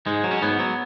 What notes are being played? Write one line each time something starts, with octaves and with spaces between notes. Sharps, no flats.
G#2 G#3
F#3
C#4
G#2 B3
F#3